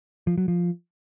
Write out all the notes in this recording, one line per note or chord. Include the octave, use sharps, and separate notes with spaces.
F3
F#3
F3